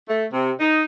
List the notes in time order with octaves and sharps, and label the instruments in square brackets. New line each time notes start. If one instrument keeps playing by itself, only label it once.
[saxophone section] A3
C3
D#4